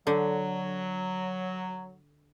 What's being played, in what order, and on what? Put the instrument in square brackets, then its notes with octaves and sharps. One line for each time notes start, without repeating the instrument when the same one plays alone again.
[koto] D3 [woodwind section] F#3 [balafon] A4